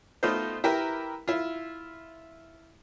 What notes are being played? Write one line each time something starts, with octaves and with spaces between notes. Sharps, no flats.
A3 B3 D#4 F4 C5
E4 G4 A#4 B4
E4 F4